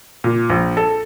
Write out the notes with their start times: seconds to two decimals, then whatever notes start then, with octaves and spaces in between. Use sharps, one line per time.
0.24 A#2
0.50 A#1
0.77 A4